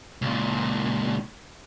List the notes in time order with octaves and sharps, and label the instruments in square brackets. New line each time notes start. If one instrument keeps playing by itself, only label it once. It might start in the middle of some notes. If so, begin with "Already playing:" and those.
[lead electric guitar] C#2 A#2